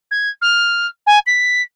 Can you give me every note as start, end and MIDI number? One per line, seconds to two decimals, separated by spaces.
0.11 0.30 92
0.42 0.87 89
1.07 1.19 80
1.27 1.62 95